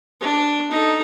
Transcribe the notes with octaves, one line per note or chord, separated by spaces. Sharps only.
D4
D#4 A4